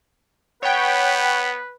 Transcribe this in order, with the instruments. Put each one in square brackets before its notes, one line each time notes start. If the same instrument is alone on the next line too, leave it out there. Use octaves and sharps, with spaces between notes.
[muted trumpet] B3 [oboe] B4 [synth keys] C#5 G5 [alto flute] F#5